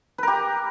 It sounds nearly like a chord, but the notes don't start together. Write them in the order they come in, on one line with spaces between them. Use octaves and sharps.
B4 A#4 G4